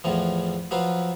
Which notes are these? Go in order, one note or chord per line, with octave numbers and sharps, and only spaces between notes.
E2 A2 E3 F3
F3 F#3 F4 B4